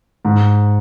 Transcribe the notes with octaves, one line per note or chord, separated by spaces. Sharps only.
G#2